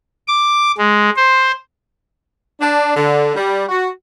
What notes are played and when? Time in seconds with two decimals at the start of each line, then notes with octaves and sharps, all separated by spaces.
0.28 D6
0.78 G#3
1.16 C5
2.60 D4
2.95 D3
3.36 G3
3.69 F#4